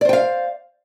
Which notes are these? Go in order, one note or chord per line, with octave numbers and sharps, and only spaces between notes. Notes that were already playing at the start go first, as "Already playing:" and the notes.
C5 D5 F5 G5